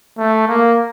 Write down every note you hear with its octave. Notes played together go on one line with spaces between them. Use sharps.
A3
A#3